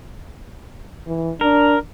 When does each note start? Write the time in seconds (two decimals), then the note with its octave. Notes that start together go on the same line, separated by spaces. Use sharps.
1.07 E3
1.41 D4 A#4